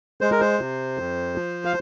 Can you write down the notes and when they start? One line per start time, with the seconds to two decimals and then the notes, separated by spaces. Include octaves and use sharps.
0.21 G#3 C5
0.31 A#4
0.40 C5
0.59 C3
0.98 F2
1.36 F3
1.65 F5